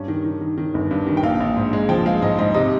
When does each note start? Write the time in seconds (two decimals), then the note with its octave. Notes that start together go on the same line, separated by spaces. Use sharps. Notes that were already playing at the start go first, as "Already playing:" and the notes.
Already playing: G2 C#4
0.08 D#3
0.25 D#3
0.41 D#3
0.58 D#3
0.74 G1
0.91 G2
1.07 D#3
1.17 G5
1.23 A#1 F5
1.40 A#1
1.56 G#2
1.73 G#3
1.89 F3 G5
2.06 G#3 F5
2.22 G#2 D#5
2.38 G#2 D#5
2.54 C3 D#5